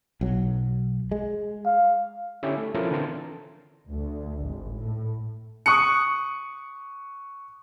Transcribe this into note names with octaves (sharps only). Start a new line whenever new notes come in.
B1 F#3
G#3
F5
D3 C#4 E4 G4 E5
A3
F3 C#4 E4 F4 A4 A#4
D3 E3 C4 A#4 C5 A5
D2
G#1
A2
C#6 D#6 F#6 C#7